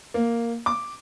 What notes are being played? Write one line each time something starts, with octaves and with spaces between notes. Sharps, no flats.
A#3
D6